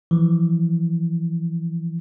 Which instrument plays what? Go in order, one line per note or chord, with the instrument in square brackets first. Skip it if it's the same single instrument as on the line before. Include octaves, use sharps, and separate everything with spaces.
[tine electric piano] E3 F3